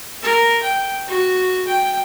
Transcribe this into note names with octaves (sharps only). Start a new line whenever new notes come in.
A#4
G5
F#4
G5